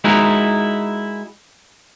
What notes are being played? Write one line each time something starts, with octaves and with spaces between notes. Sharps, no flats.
G#3 D#4 E4 F#4 A#4